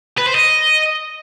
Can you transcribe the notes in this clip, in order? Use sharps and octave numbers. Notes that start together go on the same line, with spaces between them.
B4
C5
D#5